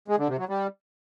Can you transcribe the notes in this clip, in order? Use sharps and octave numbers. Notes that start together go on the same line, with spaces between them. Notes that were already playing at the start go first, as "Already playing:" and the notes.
G#3
D3
C3
F#3
G3